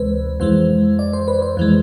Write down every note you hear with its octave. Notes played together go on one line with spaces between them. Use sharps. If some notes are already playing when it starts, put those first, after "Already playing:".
Already playing: D2 C3 E3 G#3 B4 C5
F2 E3 G#3 C5
D5
C5
B4
C5
F2 E3 G#3